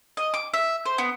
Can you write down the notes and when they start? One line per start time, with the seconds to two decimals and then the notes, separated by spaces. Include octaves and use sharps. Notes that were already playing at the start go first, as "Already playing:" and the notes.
0.17 D#5
0.34 D6
0.54 E5
0.86 C5
0.98 B3